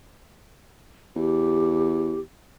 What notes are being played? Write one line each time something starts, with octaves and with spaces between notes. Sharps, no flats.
E2 G4